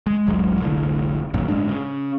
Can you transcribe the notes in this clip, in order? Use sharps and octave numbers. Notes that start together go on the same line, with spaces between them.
G#3
D#1 A1 F#3 G#3
F1 C2 A2 D3
A1 F#2 A#2 D#3
G1 A2 G#3 D4
C#3